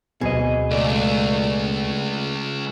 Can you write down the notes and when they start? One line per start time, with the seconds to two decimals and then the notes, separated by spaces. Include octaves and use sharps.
0.21 D2 B2 F#3 C4 G#4 D#5
0.71 C#2 A3 D5